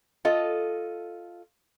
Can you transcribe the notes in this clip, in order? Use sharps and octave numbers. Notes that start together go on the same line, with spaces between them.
F4 A4 D#5